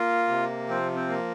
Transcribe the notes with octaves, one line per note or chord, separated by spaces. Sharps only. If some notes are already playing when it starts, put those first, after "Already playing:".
Already playing: A#3 F4
C3
F3 C4
C4
A#3